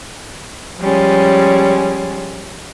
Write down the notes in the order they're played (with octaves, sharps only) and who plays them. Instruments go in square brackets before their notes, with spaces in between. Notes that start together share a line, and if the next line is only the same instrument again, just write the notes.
[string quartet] F3 G3 G#3 C#4